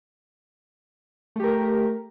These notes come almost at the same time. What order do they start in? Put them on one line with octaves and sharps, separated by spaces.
A3 G4 A#4